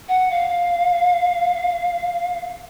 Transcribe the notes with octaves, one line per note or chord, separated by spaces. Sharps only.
F#5
F5